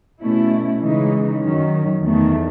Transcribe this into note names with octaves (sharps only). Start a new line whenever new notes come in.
B2 A3 C#4 E4
C#3 E3 G#3 D#4
F#2 D#3 F#3 C#4
E2 D#3 A3